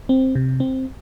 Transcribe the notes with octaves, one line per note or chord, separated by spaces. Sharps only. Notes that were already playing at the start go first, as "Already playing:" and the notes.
C4
C3
C4